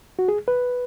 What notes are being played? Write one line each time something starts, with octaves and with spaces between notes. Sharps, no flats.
F#4
G#4
B4